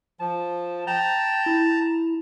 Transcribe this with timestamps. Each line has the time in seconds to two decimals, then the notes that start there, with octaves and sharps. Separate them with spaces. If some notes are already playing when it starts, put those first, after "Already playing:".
0.20 F3 A5
0.87 G5 A5 A#5
1.46 E4